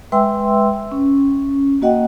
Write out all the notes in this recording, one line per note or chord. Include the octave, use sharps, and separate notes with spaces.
G#3 B4 E5 G5 C6 E6
C#4
A#3 F#4 D#5 F#5 G5